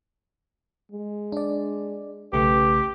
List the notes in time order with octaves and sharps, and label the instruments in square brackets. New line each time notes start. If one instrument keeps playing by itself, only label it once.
[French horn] G#3
[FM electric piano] D4 D5
[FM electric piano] B1 C#3 A3 [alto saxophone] G4 [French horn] B4